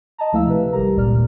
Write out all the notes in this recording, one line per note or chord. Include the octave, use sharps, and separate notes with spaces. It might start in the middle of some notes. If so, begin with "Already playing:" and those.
D#5 A5 A#5
D2 F3 A3 E4 F5 E6
C3 B4
G#1 G3 G4 A#4 A#5
G1 C#2 A#2 D5 F6
D#2 A#2